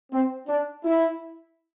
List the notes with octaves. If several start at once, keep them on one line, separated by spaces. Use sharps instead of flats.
C4
D4
E4